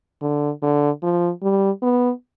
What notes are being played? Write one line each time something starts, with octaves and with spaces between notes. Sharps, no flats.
D3
D3
F3
G3
B3